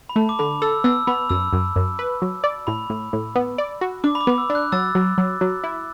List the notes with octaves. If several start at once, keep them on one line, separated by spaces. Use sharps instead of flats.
B5
A3 A5
D6
D3 B5
A4 E6
B3 E6
B3 B5
F#2 E6
F#2
F#2
B4
F#3
D5
A2 B5
A2
A2
B3
D5
F#4
D4 D6
B5
D6
B3
E6
D4
F#6
F#3 E6 A6
F#3
F#3
F#3
E4